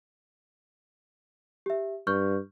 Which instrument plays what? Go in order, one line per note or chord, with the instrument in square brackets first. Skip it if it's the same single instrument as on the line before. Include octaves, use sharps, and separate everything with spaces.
[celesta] G4 E5
[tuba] G2 [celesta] C#6 F6 G6